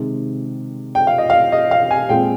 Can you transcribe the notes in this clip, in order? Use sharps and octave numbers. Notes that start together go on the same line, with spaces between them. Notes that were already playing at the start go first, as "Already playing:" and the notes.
Already playing: C3 D#3 G#3
G5
F5
D#5
F5
D#5
F5
G#5
A#2 G#3 C4 G5